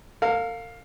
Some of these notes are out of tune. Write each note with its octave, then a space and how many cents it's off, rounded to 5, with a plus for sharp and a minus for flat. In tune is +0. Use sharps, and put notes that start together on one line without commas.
A#4 -45 F5 +10